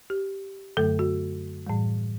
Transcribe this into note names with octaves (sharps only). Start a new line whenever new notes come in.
G4
F#2 D3 F#3 A3 A4
F#4
A2 E3 G3